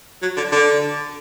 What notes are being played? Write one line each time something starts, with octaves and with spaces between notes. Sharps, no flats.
F#3
D3
D3